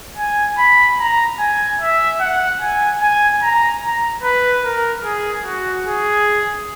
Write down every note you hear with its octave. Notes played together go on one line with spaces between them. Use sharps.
G#5
B5
A#5
G#5
E5
F#5
G#5
G#5
A#5
A#5
B4
A#4
G#4
F#4
G#4